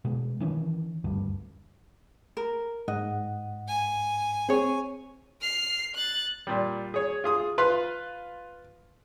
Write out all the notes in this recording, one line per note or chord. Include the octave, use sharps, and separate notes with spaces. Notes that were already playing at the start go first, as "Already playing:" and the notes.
B2 G#3
D#3 E3 C#4
F#1 D2 G2
A#4
G#2 D#5 F#5
G#5
C4 G#4 C#5
F6 C7
F#6 A6
A#2 G3
G#4 C#5
F4 G#4 D#6
F4 B4 C6